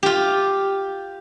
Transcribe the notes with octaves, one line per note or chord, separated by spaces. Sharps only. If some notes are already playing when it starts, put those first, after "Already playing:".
F4 G4